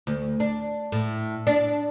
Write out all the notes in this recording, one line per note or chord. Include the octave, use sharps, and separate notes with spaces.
D2
D4
A2
D4